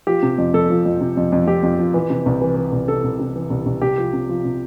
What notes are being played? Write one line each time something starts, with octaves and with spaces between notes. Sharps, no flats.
F3 G4
C3
F2
F2 A4
F3
F2
C3
F2
F2
F2 G4
F2
F3
E3
C3
C2
E3
E3
C2
C3 A4
C2
C3
E3
C2
C2
C2 G4
F3
C3
F3
C3